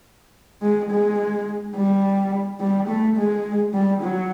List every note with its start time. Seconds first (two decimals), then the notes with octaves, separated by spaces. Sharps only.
0.62 G#3
0.91 G#3
1.76 G3
2.60 G3
2.88 A3
3.16 G#3
3.74 G3
4.02 F#3